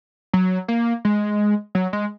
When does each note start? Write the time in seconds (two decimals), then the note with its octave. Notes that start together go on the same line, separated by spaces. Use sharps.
0.33 F#3
0.68 A#3
1.05 G#3
1.75 F#3
1.93 G#3